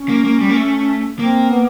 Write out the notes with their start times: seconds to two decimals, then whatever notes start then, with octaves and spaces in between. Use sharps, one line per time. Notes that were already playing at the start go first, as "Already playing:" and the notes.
Already playing: C#4
0.09 A#3
0.24 A#3
0.41 G3
0.49 A#3
0.56 A3
1.19 A#3 C4
1.50 B3